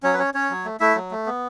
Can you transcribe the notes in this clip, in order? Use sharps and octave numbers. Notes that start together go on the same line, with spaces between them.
F#3 C#4 C#5
B4
C#4 C#5
C#4 C#5
F#3
A3
A3 E4 E5
F#3
A3
B3